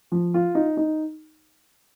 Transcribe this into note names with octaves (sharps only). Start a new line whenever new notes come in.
F3
F4
D#4
D#4